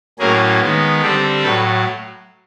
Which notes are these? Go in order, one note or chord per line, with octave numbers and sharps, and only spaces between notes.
A2 F#3 A#3 C#4 G#4 A#4
D#3 G#3 B3
D3 G3 C4 G4 A4
A2 F#3 A4 B4